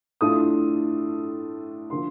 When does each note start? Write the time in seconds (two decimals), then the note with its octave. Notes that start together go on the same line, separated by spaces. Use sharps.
0.21 A2 A3 D4 F4 D#6
1.90 D3 F3 A#3 C6